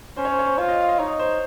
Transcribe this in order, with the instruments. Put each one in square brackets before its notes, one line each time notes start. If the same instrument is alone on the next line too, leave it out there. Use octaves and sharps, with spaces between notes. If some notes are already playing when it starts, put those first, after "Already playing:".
[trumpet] C#4 [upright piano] C5
[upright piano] C#5
C5
C#5
C5
[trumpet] F4 [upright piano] C#5
[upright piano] D#5
F5
D#5
[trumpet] D#4 [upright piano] C#5
[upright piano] C5